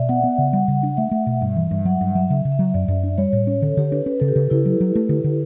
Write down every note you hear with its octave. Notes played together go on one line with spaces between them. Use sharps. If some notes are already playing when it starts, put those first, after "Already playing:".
Already playing: B2 D5 E5
B3 F#5
B3
C#3
G3
C#3
D4
A3 E5
A3
B2
G2
E3
G2
F#3 F#5
G2 F#5
F#3 E5
C#3 E5
C#3
E5
F#3
F#2 D5
F#2
D4
G3 C#5
A2
C#4
D3 A4
D3 G4
D4 B4
C#4 B4
C#3 A4
G4
C#3
C#3 E4
F#3
F#3
A3
D3
D3